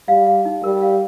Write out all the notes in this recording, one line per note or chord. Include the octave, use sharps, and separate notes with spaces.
G3 F5
F5
D#4
G3 A#4
F5